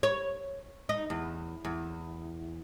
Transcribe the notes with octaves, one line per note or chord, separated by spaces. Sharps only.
C#5
D#4
E2
E2